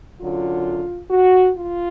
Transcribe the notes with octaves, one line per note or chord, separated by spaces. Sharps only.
F#2 D3 F#3 F4
F#4
F4